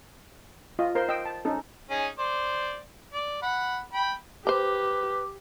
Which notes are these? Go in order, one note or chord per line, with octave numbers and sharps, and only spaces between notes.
F4 D#5
A#4 C5 C6
D#5 G5 E6
A5
C#4 D#4 A4
C#4 D#4 G#4
C5 D5
D5
F#5 B5
G5 B5
G4 B4 C5 A#5 D6